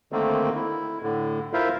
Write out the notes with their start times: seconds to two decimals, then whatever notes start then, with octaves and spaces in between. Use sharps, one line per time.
0.12 D3 D#3 A3 A#3 C4
0.56 E4
1.03 A2 D3
1.53 E4 F4 A#4 C5 E5 F5